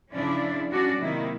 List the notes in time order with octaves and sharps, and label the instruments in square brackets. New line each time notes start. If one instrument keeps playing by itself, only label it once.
[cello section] C#3 F3 C#4 D4 E4 D5
G3 C#4 D4 F#4 D5
C3 D#3 F#3 A#3 E4